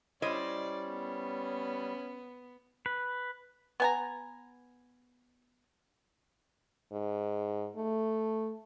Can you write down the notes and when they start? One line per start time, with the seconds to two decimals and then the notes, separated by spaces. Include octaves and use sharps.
0.22 G3 C#4 E4 C5 D5 D#5
0.89 B3
2.86 B4
3.80 B3 G#5 A#5
6.92 G#2
7.76 A3